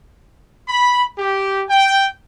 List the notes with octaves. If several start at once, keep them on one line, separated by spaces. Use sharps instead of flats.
B5
G4
G5